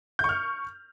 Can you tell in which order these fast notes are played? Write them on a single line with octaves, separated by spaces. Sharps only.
G6 C#6 F6